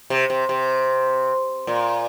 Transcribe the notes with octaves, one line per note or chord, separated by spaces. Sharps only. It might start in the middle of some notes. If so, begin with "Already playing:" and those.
C3
C3
C3
A#2